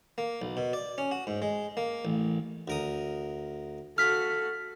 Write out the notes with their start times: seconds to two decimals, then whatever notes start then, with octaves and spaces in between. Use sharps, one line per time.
0.18 A#3
0.42 B1
0.57 B2
0.73 D5
0.98 C#4
1.11 F#4
1.27 G#2
1.42 G#3
1.77 A#3
2.05 A1
2.68 D2 A#4 D#6
3.98 F#4 A4 F5 F6 B6